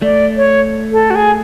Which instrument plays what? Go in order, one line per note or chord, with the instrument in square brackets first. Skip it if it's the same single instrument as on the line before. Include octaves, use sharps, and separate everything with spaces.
[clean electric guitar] A3 [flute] D5
[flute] C#5
A4
F#4
G#4